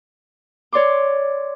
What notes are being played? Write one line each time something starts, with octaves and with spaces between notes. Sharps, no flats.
C#5 D5 C6 D6